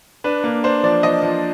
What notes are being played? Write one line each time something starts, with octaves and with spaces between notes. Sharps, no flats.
D4 B4
A#3 B4
D4 C5
F3 D5
F3 D#5
F3